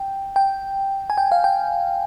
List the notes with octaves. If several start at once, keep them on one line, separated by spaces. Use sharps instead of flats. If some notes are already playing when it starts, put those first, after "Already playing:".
Already playing: G5
G5
G#5
G5
F5
G5